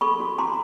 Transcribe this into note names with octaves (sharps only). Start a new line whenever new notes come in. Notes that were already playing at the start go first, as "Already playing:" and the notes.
A4 B5 C#6
F#4
F#4 A#5 C6